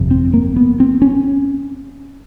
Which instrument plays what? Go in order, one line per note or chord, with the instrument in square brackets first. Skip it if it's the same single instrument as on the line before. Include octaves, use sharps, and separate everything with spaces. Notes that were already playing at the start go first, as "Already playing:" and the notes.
Already playing: [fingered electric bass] G1 F2 C3
C4
A#3
B3
C4
C#4